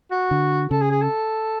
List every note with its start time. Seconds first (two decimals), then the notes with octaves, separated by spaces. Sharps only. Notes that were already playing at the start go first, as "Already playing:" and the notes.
0.11 F#4
0.31 D3
0.71 C#3 A4
0.81 G#4
0.91 G#4
1.02 A4